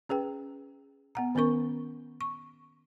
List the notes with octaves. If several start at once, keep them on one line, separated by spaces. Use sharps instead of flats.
C#4 G#4 B4 G5
B3 F#5 A#5
D#3 B3 C#4 A#4 C#6
C#6